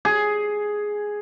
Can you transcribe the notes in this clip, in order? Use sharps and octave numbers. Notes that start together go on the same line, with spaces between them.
G#4